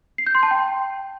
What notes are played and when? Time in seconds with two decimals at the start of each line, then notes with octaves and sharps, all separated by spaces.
0.18 C7
0.26 G6
0.35 C6
0.43 A5
0.51 G5